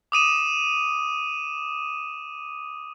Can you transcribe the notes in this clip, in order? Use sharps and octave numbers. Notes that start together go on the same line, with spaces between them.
D6 D#6 D#7 E7